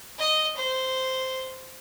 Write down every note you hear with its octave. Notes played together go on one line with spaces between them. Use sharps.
D#5
C5